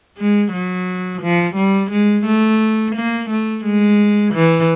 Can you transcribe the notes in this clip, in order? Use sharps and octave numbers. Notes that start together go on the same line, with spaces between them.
G#3
F#3
F3
G3
G#3
A3
A#3
A3
G#3
E3